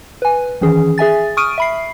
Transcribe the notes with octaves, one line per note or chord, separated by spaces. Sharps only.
B4 G#5
D#3 E3 C#4 G#4
G#4 E5 G#5 A6
C#6 D#6 F6 D7 D#7
E5 B5 C7